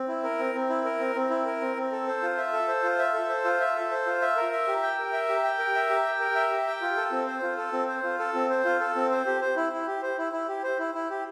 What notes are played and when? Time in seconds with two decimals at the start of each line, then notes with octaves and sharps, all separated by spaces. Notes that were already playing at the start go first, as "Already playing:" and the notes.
Already playing: C4
0.08 E4
0.24 A#4
0.39 C4
0.54 C4
0.69 E4
0.84 A#4
1.00 C4
1.15 C4
1.30 E4
1.46 A#4
1.61 C4
1.77 C4
1.92 A4
2.07 C5
2.23 F4
2.37 E5
2.53 A4
2.68 C5
2.83 F4
2.99 E5
3.14 A4
3.29 C5
3.45 F4
3.60 E5
3.75 A4
3.91 C5
4.06 F4
4.21 E5
4.37 A#4
4.52 E5
4.67 G4
4.83 G5
4.98 A#4
5.13 E5
5.28 G4
5.44 G5
5.59 A#4
5.75 E5
5.89 G4
6.05 G5
6.20 A#4
6.35 E5
6.51 G4
6.67 G5
6.81 F4
6.97 A4
7.12 C4
7.27 C5
7.43 F4
7.57 A4
7.73 C4
7.88 C5
8.03 F4
8.19 A4
8.34 C4
8.50 C5
8.65 F4
8.80 A4
8.95 C4
9.11 C5
9.26 G4
9.41 C5
9.56 E4
9.72 E4
9.87 G4
10.02 C5
10.18 E4
10.33 E4
10.48 G4
10.64 C5
10.79 E4
10.94 E4
11.10 G4